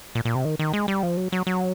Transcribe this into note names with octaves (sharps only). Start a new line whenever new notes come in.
A#2
A#2
C3
D#3
D#3
G#3
G3
F3
F#3
F#3
F#3